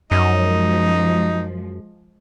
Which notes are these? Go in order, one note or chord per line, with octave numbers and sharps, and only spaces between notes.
F#2 F3 G#3 D#4